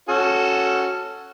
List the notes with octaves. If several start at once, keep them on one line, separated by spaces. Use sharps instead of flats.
C#4 F#4 A4